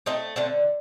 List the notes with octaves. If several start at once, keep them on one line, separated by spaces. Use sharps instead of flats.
A3 C4 D#4
D3 A3 C4